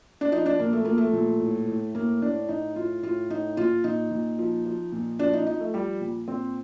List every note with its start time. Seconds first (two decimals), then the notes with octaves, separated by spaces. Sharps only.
0.21 D4
0.32 F3 D#4
0.46 D4
0.59 A#2 A#3
0.73 A3
0.85 F3 A#3
0.98 A3
1.13 A#2
1.40 A2
1.68 A2
1.95 A2 A#3
2.22 A2 D4
2.49 A2 D#4
2.76 A2 F4
3.03 A2 F4
3.30 A2 D#4
3.57 A#2 F4
3.84 A#2 D#4
4.11 A#2
4.39 F3
4.66 F3
4.92 A#2
5.19 F3 D4
5.33 D#4
5.46 F3 D#4
5.60 A3
5.74 F3 G3
6.01 A#2
6.28 A#2 C4